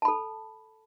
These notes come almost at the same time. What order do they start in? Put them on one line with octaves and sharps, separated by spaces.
A5 B5 A4